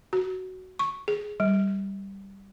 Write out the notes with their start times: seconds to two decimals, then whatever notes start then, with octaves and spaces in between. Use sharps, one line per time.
0.13 F#4
0.79 C#6
1.08 G#4
1.40 G3